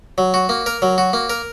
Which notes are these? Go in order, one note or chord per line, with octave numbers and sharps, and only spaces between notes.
F#3
F#4
A#3
A#4
F#3
F#4
A#3
A#4